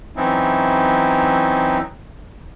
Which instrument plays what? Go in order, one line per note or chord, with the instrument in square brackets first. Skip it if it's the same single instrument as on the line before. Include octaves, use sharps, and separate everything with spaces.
[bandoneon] E3 F#3 C4 C#4 D#4 E4